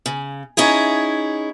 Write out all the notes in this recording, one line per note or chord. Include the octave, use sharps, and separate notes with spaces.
C#3
C#4 D#4 E4 G#4